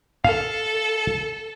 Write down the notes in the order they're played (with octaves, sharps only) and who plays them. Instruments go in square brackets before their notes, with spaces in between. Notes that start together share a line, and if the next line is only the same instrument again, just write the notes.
[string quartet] A4 [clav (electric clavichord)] F5